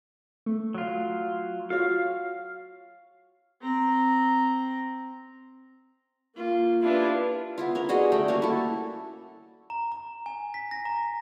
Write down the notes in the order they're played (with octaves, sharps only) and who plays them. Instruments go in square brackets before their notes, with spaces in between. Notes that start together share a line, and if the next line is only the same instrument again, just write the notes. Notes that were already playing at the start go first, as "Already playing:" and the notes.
[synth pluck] A3
[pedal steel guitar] F#3 F4
[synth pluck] F4 F#4 C#5 [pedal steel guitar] F5
[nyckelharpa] C4 A#5
A#3 F4
[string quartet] D4 E4 F4 [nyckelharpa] G4 B4
[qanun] B3 E4 F4
C#4 A#4
G3 F#4 G#4 D#5
G3 A3 G5
A#3 C#4 F#4
E4 A4
[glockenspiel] A#5
A#5
G#5
B6
A#6
A#5